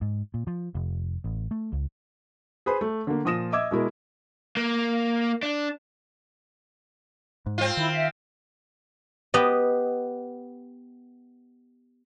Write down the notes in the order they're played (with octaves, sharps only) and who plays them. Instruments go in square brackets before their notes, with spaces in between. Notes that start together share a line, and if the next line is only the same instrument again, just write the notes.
[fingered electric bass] G#2
A#2
F3
F1
A1
A3
C#2
[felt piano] G#4 B4 C5 B5
A3
D3 A#3
A#2 F3 D#6 A#6 E7
D#5 E5 D6 E6 G#6
B2 G#3 E4 A#4
[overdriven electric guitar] A#3
D4
[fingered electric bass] G#2
[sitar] C4 F4
[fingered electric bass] D#3 [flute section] E4
[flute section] E5 F5
[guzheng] B3 G4 D#5